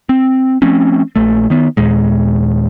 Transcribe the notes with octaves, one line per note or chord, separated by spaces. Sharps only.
C4
F3 A3 C4 C#4
A#1 A#2 A3
D#3 B3
D#2 A#2 G#3